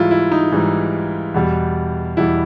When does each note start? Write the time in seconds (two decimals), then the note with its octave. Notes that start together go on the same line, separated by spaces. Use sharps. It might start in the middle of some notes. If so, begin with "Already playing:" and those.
Already playing: G#2 E3 G3 E4 F4
0.11 E4
0.32 D#4
0.52 G#2 E3 G3
1.34 E2 B2 G3
2.17 E2 B2 G3 E4